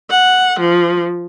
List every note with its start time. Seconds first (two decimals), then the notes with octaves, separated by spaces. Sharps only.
0.10 F#5
0.60 F3